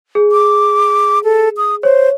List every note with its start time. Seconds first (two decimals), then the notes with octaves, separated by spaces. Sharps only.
0.15 G#4
0.32 D6
1.24 A4
1.57 D#6
1.83 C5 C#5